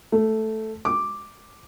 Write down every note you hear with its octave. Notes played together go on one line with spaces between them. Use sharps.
A3
D6